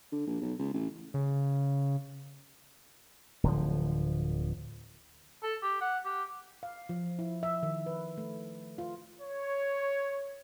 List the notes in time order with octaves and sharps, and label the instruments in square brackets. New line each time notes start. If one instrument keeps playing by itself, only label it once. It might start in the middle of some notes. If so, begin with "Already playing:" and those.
[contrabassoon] D3
A#1
B1
C#2
A1
[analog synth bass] C#3
[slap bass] D1 D3 F3
[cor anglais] A4
G4
F#5
G4
[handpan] F5
F3
E4
E5
D#3
B4
A3
F4
[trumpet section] C#5